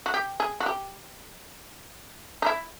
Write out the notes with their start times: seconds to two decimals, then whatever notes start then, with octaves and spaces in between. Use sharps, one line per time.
0.06 F#4
0.14 G4
0.40 G#4
0.60 F#4
0.66 G4
2.42 D#4
2.46 E4